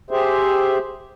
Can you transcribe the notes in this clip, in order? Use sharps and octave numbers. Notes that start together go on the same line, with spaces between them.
G4 G#4 C5 E5